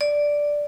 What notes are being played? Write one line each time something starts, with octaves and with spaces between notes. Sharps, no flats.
D5